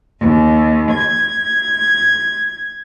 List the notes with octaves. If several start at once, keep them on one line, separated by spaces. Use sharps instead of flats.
D#2
G#6